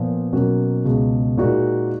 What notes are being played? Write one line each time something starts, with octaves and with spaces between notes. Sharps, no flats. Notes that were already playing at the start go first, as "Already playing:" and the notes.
Already playing: A#2 F3 B3
B2 F#3 A#3 C#4 F#4
C#2 B2 G#3
A#2 G#3 D#4 F#4